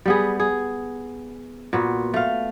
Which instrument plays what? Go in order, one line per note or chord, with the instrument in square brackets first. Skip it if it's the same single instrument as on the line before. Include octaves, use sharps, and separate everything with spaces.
[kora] G3 B3 G#4
G#4
A#2 B3 F#4
A3 F5